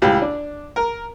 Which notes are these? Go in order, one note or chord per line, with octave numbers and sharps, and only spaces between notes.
C#2 A2 G3 G4
D4
A#4